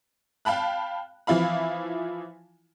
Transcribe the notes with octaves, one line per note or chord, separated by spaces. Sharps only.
F5 G5 A5 B5 F#6
E3 F3 E4 F5 B5